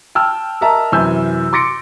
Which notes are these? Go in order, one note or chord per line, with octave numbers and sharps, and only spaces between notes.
G5 A5 E6 F6
A#4 D#5 E5 A5 A#5
F#2 C3 E3 G#5 E6 G6
C6 D6 A6 A#6 C#7 D7